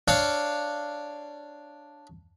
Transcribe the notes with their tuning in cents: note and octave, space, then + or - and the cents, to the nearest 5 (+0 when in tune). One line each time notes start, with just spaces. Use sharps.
D4 +0 C#5 +0 F5 -15